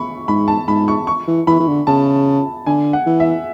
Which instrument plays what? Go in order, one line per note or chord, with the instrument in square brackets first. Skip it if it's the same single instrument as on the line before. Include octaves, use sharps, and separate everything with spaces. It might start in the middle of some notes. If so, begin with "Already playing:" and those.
Already playing: [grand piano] B5 C#6
[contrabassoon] G#2 [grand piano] B5
[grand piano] A5
[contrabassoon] G#2 [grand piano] B5
[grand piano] C#6
C#6
[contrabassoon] E3
[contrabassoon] E3 [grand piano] B5
[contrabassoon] E3
D3
[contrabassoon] C#3 [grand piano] A5
[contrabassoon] D3 [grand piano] G#5
[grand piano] F#5
[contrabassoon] E3
[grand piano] E5